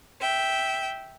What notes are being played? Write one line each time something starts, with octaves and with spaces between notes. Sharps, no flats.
E5 G5